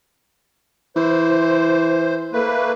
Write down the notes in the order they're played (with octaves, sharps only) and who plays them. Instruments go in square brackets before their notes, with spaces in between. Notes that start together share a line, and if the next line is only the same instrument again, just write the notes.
[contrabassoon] E3 [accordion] C5
[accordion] A3 A#3 B4